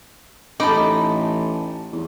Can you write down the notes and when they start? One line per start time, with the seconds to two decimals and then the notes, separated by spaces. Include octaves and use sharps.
0.60 A1 D#4 A4 B5 D6
1.93 E2